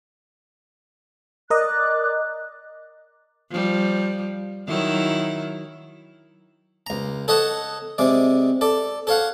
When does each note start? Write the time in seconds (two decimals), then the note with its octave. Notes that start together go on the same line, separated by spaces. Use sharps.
1.50 A#4 D5 D#5 D6 F#6
3.51 F3 G3
4.68 D#3 F#3 E4
6.87 C#2 A#5
7.28 A4 C#5 D#5 F#5 A5
7.98 C3 G#3 D5
8.61 A4 D5
9.07 A4 C#5 F5 F#5